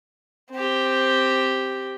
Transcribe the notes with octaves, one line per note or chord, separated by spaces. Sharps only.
C4 G4